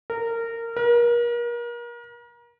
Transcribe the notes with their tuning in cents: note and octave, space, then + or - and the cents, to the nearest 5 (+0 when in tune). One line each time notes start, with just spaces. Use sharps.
A#4 -20
A#4 +35